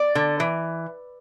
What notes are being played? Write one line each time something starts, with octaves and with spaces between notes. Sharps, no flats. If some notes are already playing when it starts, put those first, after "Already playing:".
Already playing: D5
D3
E3